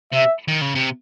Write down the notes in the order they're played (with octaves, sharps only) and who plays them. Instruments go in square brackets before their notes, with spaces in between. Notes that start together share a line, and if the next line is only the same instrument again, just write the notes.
[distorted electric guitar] C3 [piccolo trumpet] E5
[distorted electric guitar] D#3
C#3
C3